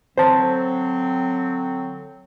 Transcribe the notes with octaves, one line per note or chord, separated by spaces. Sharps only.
D3 F#3 C4 C5 A5